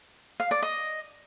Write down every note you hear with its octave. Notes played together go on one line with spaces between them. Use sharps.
F5
D5
D#5